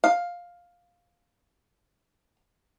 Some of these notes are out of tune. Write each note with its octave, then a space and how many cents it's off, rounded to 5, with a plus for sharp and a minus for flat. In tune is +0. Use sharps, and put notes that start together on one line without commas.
F5 +10